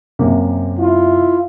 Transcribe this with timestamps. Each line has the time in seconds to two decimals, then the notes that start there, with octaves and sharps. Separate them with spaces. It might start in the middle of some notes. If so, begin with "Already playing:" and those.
0.19 F#2 C3 A#3
0.79 E4 F4